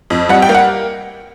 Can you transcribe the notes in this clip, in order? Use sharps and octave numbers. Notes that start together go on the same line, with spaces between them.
F2
G3 F#5
G5
A#3
F#5